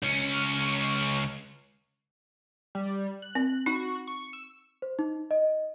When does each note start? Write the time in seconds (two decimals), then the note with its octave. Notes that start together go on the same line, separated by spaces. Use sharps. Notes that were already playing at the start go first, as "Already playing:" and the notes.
0.03 C#2 C#4
2.75 G3
3.22 F#6
3.35 C4
3.66 D#4 F#4
4.07 C#6
4.33 E6
4.82 C5
4.99 D#4
5.31 D#5